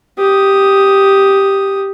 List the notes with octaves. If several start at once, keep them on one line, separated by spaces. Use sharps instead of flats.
G4 D#6